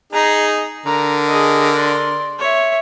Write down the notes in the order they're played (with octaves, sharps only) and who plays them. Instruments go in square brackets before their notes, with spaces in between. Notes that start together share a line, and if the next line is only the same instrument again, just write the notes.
[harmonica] D#4 G#4 [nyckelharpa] A#5
[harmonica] D3 A#4 [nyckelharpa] A#5
[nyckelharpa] G#4 D#5
D5 C6
C#5 E5